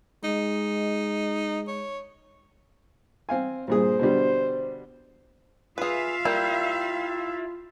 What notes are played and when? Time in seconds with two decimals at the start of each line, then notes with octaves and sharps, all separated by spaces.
0.24 G#3 D#4
1.68 C#5
3.29 C4 F5 G#5
3.68 G2 A#2 G#4 C5
3.99 B2 D3 G3
5.78 F4 G#4 B4 E5 F5
6.25 G3 A#3 E4 G5